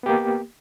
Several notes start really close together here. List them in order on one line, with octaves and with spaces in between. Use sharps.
B3 G4 A#3